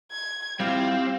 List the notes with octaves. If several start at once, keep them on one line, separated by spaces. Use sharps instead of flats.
G#6
G3 C4 E4 F4 G4 F5